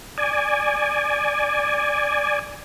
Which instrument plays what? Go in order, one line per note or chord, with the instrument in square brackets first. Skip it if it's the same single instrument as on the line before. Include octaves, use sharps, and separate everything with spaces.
[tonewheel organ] D5 G#5